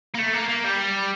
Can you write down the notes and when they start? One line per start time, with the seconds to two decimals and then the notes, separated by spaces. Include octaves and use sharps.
0.15 A#3
0.19 A3
0.34 A#3
0.49 A#3
0.64 G3